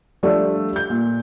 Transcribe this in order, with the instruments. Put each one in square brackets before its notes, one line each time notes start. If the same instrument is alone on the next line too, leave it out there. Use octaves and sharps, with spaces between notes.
[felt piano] F3 G3 A3 D4
G6
A#2